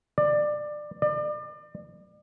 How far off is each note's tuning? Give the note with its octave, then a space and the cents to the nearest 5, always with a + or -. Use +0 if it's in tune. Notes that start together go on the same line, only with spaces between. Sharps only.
D5 +20
D5 +35